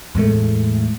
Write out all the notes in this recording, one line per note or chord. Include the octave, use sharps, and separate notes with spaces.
E2 A2 G#3 A3